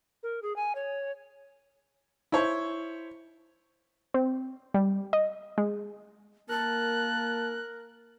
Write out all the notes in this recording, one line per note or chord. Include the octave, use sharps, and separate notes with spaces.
A#4
G#4
G#5
C#5
E4 C5 C#5
C4
G3
D#5
G#3
A#3 A#4 A5 F#6